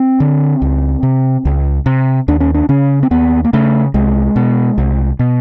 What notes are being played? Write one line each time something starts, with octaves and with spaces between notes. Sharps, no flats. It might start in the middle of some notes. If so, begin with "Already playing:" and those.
Already playing: C4
D3
C#2
C3
C#2
C3
D#2 D4
C#4
D4
C#3 C#4
C4
D#2 B3
A#3
C#3 A3
C2 G#3
B2
C2
B2